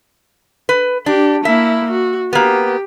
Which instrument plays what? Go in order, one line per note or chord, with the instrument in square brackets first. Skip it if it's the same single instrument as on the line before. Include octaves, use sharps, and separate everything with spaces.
[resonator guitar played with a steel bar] B4
[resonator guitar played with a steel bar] D4 [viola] G4
[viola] A#3 E4 [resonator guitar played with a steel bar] E5
[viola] F#4
[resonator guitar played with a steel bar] A#3 B3 [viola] G4